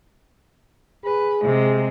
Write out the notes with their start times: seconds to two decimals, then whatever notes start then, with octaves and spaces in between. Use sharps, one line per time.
1.05 G#4 B4
1.43 C3 G#3